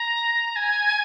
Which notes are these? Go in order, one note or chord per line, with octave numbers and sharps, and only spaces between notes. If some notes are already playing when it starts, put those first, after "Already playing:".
Already playing: A#5
G#5